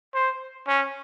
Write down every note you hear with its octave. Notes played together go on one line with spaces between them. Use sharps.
C5
C#4